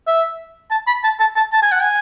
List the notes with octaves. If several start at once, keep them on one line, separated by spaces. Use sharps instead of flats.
E5
A5
B5
A5
A5
A5
A5
G#5
F#5
G#5